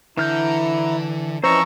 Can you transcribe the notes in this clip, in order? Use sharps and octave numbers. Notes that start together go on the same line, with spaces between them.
D3 E3 E4 A#5 F6 G6
F2 E3 C#4 C5 D#5 A#5 C#6 E6